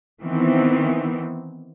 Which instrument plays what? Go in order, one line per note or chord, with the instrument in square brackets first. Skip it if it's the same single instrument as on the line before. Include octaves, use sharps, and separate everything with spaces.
[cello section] D#3 E3 B3 C4